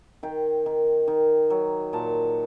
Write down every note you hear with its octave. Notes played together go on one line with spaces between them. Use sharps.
D#3 G5
D#3
D#3
F#3
A#2 A5